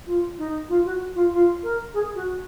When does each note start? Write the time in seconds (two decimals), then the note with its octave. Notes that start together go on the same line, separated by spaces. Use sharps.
0.06 F4
0.38 D#4
0.69 F4
0.85 F#4
1.15 F4
1.32 F4
1.63 A#4
1.94 G#4
2.15 F#4